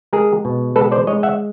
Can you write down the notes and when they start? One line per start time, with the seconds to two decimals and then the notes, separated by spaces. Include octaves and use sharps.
0.13 G#3 G#4 A#4
0.45 B2
0.76 G#3 A4 B4
0.91 C5 D5
1.07 G#3 C#5 D#5
1.23 E5 F#5